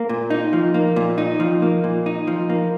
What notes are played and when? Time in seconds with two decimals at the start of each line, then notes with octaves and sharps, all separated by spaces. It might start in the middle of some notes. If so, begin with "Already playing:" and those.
Already playing: A#3
0.09 A#2
0.30 D#4
0.53 F3
0.74 A#3
0.96 A#2
1.18 D#4
1.40 F3
1.62 A#3
1.84 A#2
2.06 D#4
2.27 F3
2.50 A#3